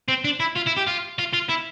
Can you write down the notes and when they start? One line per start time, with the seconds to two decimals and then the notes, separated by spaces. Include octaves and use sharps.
0.09 C4
0.25 D4
0.40 E4
0.56 F4
0.66 E4
0.77 G4
0.87 F4
1.19 F4
1.34 F4
1.49 E4